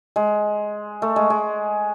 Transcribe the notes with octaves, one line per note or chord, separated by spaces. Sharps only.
G#3
A3
G#3
G#3